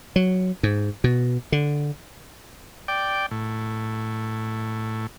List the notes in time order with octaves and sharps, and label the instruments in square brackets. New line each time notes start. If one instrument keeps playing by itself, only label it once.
[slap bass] F#3
G#2
B2
D3
[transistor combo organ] D5 G5
A2